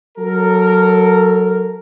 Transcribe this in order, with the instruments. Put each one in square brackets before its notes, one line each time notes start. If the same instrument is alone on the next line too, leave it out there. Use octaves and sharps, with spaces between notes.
[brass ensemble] F#3 A4 A#4